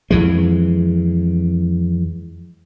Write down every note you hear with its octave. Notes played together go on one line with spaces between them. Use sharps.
F2 E3 G#3